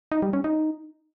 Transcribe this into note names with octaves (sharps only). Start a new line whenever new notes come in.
D#4
G3
C#4
D#4